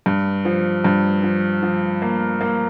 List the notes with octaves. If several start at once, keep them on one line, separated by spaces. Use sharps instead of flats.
G2
F3
G2
F3
F3
A#3
A#3